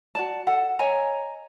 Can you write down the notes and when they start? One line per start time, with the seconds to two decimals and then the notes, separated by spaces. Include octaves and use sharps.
0.15 F#4 D5 A5
0.47 A4 F#5
0.79 C#5 D#5 G#5 A#5